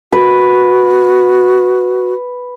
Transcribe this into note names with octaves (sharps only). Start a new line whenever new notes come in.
F#4 B4